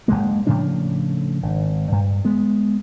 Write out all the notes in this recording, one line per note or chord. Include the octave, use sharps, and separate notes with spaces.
F#1 G2 G#3 A#3
A2 C#3 F3 D4
G#1
G2
G#3 B3